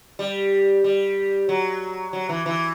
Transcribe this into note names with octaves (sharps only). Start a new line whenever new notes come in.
G3
G3
F#3
F#3
E3
E3